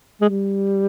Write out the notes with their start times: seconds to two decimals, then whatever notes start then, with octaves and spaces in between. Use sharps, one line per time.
0.21 G#3
0.29 G3